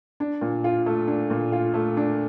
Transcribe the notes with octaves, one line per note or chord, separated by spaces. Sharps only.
D4
A#2
F4
A3
D4
A#2
F4
A3
D4